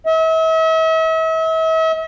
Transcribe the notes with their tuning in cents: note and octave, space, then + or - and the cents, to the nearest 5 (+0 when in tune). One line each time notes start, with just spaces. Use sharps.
E5 -40